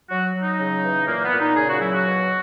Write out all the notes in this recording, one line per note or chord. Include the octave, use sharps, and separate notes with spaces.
F#3 F#4
F#3
D#4
C#3
E3
A#2 A#3
B3
A#2
D#4
C#3 G#4
F#4
F#3 E4
F#4
B2